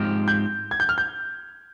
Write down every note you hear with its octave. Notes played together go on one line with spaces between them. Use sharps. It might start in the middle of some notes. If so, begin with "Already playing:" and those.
Already playing: G#2 F3 C4 G4 F6
G6
G#6
G6
F6
G6